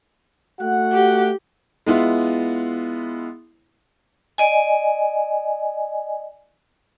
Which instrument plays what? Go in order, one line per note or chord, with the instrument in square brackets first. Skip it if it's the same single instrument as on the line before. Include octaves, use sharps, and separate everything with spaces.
[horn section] A3 F#4 F#5
[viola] G4
[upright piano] G#3 B3 E4 F4
[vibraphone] D5 D#5 G#5